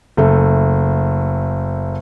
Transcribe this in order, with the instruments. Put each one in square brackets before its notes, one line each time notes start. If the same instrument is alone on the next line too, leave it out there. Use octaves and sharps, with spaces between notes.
[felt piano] F#1 A3